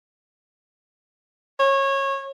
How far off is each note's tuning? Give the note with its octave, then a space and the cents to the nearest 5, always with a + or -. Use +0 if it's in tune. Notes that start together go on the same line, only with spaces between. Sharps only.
C#5 -20